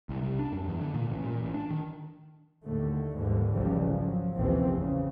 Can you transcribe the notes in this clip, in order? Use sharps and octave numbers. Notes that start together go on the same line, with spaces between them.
C2
C2
D4
F#2
E2
D3
A#2
A1
A#2
A1
D4
D#3
D#2 A2 D3 A3
D#2 G#2 D3 E3 G3
G#1 C#2 C#3 E3 F3 G3
F3 F#3
A1 D#2 C3 E3 F3 C4
E2 C#3